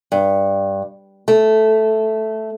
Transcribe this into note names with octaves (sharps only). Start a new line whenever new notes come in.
G2
A3